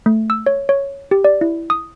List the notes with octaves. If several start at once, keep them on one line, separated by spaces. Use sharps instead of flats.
A3
E6
C#5
C#5
G4
D5
E4
D#6